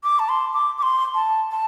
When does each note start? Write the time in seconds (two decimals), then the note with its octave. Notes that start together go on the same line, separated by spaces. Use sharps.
0.04 D6
0.19 A5
0.29 C6
0.53 D6
0.78 D6
0.83 C6
1.14 A5
1.51 A5